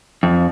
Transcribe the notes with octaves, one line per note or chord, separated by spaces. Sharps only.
F2